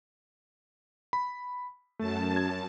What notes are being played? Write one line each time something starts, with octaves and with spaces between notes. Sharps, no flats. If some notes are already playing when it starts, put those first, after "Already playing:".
B5
F#2 A3 A5
G#6